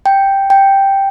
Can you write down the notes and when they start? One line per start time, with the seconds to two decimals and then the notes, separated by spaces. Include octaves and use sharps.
0.06 G5
0.50 G5